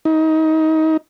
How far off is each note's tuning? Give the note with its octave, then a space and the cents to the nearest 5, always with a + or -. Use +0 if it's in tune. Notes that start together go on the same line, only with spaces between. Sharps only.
D#4 +25